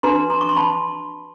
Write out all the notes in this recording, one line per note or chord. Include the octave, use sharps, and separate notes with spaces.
D4 F#4 B4 A#5 C6
A#5 C6
C#6
C6
A5 B5